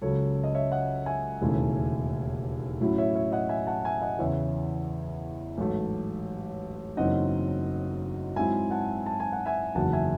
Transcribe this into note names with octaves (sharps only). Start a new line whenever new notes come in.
C#2 C#3 F#3 C#4 A4 C#5
D#5
C#5 E5
D#5 F#5
E5 G#5
E1 D#2 C#3 E3 A3
A2 F#3 C#4 E4
C#5 E5
C#5 E5
D#5 F#5
E5 G#5
F#5 A5
E5 G#5
D#5 F#5
E2 C#3 E3 C#5 E5
A1 G#2 F#3 A3
F#1 F#2 E3 C4 D#4 D#5 F#5
G#2 F#3 C4 E4 E5 G#5
F#5 A5
A5
G#5
F#5
E5 G#5
F#1 E2 D#3 F#3 F#5 A5
E5 G#5